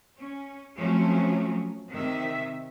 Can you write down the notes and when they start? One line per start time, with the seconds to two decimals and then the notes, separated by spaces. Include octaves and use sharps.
0.19 C#4
0.76 F3 F#3 A3 C4 C#4
1.93 C3 D#3 E5